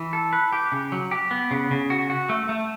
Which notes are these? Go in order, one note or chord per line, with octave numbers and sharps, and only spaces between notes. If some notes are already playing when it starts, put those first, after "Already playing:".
Already playing: E3
A4
B4
G4
C#3
F#3
G4
B3
C#3
C#3
F#4
F#4
A3
A3